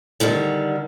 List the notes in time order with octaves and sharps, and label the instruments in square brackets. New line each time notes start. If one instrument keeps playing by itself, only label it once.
[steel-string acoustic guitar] D3 D#3 F#3 G3